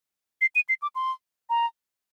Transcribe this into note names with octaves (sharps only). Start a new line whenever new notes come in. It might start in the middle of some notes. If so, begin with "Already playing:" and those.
C7
D#7
C7
D6
C6
A#5